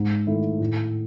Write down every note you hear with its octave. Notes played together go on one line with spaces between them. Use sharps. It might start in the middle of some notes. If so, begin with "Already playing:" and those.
Already playing: G#2
D#3 A3 E4
A2